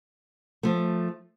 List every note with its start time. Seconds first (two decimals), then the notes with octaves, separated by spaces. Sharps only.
0.63 F3 A3